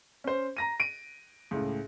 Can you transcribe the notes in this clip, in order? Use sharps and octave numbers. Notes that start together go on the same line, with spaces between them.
C#4 C5
A#5 A#6 D#7
D7 D#7
C#2 A2